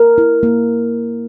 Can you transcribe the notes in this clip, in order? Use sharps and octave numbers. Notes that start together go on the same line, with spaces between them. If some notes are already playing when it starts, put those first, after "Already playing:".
Already playing: A#4
E4
A#3